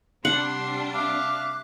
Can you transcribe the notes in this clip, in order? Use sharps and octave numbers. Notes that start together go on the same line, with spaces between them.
C3 G3 D4 F#5 C6
E5 F5 D6 F#6